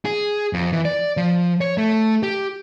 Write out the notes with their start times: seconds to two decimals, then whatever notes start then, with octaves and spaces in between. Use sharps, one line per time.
0.05 G#4
0.53 F2
0.72 E3
0.85 D5
1.17 F3
1.61 C#5
1.78 A3
2.23 G4